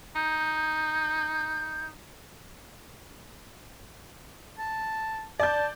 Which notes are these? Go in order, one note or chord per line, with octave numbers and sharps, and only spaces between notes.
D#4 G6
A5
D5 A5 G6